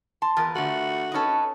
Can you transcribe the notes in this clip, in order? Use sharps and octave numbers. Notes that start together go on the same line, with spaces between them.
A5 C6
E2 F4 A#4 B4
D3 A3 F#4
C#4 D#4 A4 B4 D#5